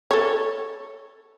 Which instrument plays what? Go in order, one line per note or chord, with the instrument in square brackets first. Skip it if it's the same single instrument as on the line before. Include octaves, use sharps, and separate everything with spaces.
[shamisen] A4 C#5